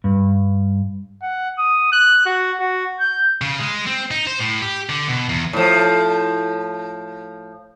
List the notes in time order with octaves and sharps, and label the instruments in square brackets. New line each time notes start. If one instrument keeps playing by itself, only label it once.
[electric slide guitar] G2
[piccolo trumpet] F#5
D#6
F#6
F#4
F#4
G6
[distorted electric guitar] C#3
G#3
C4
D#4
C5
A2
G4
D3
B2
E2
[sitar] A2 F3